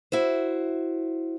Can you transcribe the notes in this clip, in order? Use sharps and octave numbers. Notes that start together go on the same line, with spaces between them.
E4 F#4 C5